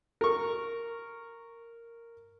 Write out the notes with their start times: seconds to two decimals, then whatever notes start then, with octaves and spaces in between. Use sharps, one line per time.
0.21 A#4 C#6